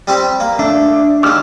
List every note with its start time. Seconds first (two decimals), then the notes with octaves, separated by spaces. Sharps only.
0.07 G3 C4 G4
0.40 A#3
0.59 A3 D4
1.23 D#2 G#3 D6 E6 F6